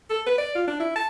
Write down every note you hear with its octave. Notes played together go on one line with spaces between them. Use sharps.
A4
B4
D5
F4
D4
E4
A5